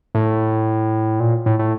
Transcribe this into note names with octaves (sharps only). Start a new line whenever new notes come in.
A2
A#2
A2
A2